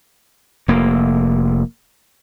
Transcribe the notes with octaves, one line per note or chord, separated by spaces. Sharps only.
F1 A#3